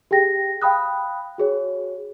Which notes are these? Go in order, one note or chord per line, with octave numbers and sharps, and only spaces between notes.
G4 G#4 G5 A#6
F5 G5 B5 D#6 F#6
F#4 G#4 C#5